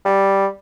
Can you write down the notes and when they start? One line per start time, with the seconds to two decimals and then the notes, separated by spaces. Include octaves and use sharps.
0.05 G3